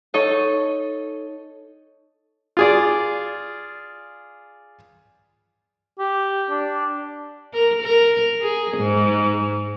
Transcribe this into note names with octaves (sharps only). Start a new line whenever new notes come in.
D#4 A4 C#5 D#5
F4 G#4 D5
G4
D4
A#4
A#4
G#4
G#2